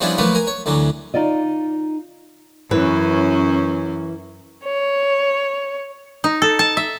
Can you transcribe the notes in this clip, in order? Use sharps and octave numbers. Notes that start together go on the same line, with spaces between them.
F3 G3 B3 C#4 D4 E4
F3 F#3 A3 A#3 B4
A#4 G#5
C#5
D2 D3 E3 F#3
D#4 F4 D5 D#5
F#2 E3 C#4 B4
C#5
D#4
A4
A5
E5